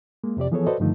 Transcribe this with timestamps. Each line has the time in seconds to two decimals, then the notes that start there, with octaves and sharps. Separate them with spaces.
0.24 G#3 A#3
0.37 F2 C3 G4 D5
0.52 E3 F3 B3 G#4 A4 C#5
0.67 F#4 A4 B4 C5 D5 D#5
0.80 G2 D3 D#3 F3 A3 D#4